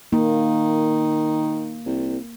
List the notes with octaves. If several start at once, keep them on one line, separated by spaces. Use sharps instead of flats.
D#3 A#3
C2